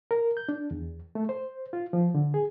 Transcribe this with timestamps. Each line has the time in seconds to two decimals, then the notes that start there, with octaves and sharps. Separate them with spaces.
0.11 A#4
0.37 G6
0.49 D4
0.71 E2
1.15 A3
1.29 C5
1.73 F4
1.93 F3
2.15 D3
2.34 G#4